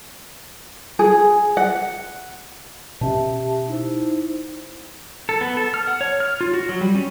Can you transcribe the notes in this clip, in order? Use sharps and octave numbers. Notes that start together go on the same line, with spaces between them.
G#4
F#5
B2 C#4 G4 E5 A5
D#4 E4 C5
A4
B3
A4
F6
F#5
C#5
F6
F4
F#4
F#3
G3
C#4